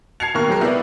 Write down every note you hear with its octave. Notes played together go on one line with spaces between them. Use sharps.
A5 G#6 C7 C#7 F7
D#2 B2 A#3 A#4 C#6 F#6
F#3 G#3 G4 G#4 A#4
B3 E4 B4 D5 E5